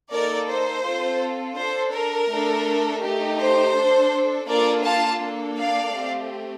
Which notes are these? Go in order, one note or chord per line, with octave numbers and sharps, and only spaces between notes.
A#3 D#4 A4 A#4 D5
C5
C4 F4 A4
D4 A4 C5
A#4
A3 D4 A4
A3 D#4 G4
C5
D4 A4
A#3 D4 F4 A4 A#4 D5
F5 A5
A#3 D4 A4
D5 F5
A3 C4 G4